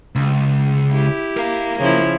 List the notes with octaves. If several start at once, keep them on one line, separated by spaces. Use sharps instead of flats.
C#2
E4 G4
A#4 F5
C#3 F3 E4